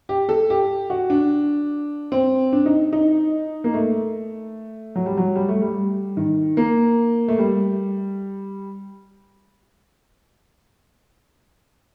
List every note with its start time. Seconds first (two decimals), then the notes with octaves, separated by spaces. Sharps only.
0.09 G4
0.29 A4
0.50 G4
0.90 F#4
1.10 D4
2.12 C4
2.52 D4
2.66 D#4
2.93 D#4
3.64 A#3
3.74 A3
4.95 F#3
5.06 G3
5.17 F#3
5.35 G3
5.49 A3
5.62 G3
6.17 D#3
6.57 A#3
7.28 A3
7.39 G3